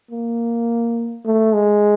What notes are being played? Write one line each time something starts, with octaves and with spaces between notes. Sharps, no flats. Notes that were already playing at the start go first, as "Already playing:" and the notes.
A#3
A3
G#3